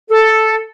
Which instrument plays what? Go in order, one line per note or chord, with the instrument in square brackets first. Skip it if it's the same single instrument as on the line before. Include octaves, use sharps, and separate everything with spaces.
[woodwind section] A4